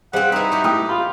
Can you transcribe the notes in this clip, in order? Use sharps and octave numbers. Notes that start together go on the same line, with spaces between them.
G3 C4 G#4 C5 F5 F#5
D#4 E4 B4
F#4 G4
A2 G4 G5 D#6
F4 B5